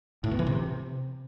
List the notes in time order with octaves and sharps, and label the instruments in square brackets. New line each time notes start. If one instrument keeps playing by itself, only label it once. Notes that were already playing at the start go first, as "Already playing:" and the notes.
[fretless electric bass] A2
B2
E3
C3